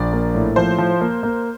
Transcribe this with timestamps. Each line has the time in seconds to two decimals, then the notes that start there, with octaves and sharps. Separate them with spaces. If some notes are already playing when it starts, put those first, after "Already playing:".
Already playing: A#1 D5
0.13 A#3
0.34 A2
0.56 F3 C5
0.78 F3
1.01 A#3
1.23 A#3